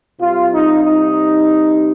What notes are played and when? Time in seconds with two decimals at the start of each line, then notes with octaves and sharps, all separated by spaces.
0.20 C3 G3 F4
0.51 D#4
0.83 D#4